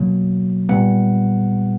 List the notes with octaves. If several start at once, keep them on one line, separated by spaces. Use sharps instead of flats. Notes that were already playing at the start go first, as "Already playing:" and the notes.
Already playing: B2 F#3 A#3
A#2 G3 B3 F#5